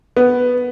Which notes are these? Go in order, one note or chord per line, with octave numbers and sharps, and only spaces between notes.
B3